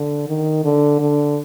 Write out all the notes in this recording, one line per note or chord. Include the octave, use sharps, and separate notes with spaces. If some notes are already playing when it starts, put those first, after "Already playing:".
Already playing: D3
D#3
D3
D3